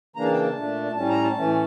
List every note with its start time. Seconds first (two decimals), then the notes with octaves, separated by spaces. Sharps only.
0.16 C#3 E3 A#3 D4 A#5
0.24 A5
0.32 G5
0.40 A5
0.56 A#2 A3 D4
0.96 A2 G3 C#4 A5
1.09 A#5
1.23 A5
1.36 A2 E3 A3 C#4